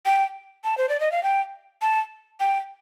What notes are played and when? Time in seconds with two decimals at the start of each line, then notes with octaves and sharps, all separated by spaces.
0.06 G5
0.64 A5
0.78 C5
0.89 D5
1.00 D#5
1.12 F5
1.23 G5
1.82 A5
2.40 G5